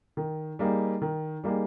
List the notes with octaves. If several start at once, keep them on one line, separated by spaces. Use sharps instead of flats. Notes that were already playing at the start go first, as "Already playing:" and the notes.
D#3
G3 A#3 D#4 G#4
D#3
G3 A#3 D#4 G#4